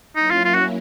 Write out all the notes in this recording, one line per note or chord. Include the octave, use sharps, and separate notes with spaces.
F#3 A#3 C#4 D#4 E4
F4
F4
F#4